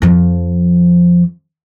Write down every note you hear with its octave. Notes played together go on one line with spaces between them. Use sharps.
F2 F3